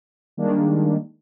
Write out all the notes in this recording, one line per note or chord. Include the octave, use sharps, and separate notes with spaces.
D#3 G3 G#3 A#3 D4